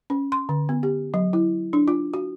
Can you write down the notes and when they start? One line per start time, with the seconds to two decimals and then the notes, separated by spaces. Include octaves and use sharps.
0.10 C#4
0.32 C6
0.49 D3
0.69 B3
0.83 G4
1.14 F#3
1.33 E4
1.73 D4
1.88 F4
2.14 F#4